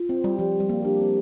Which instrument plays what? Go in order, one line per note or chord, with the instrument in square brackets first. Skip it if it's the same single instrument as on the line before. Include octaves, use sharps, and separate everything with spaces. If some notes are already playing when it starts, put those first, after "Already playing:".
Already playing: [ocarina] F4
[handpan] C4
G3
[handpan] F3 [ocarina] G4
[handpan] G3
A#3
[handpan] D4 [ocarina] G4
[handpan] C4